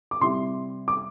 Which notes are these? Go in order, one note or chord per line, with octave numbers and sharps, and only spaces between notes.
D6
C3 G3 E4 C6
D6